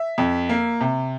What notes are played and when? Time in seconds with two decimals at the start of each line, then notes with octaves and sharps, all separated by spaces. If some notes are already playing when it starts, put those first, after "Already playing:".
Already playing: E5
0.18 F2
0.49 A#3
0.81 C3